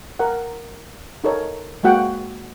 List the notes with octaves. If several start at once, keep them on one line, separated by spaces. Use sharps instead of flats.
A#4 F#5
D#4 A4 A#4 C#5
G#3 A#3 F#4 F#5 G5